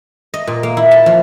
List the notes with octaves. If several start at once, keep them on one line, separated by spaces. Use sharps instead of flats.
D#5
A#2
A#3
E4
A5
F3